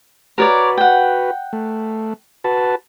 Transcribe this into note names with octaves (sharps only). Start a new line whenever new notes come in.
F#4 A#4 B4 C#5 D5
F#5 G5
A3
F#4 B4 A5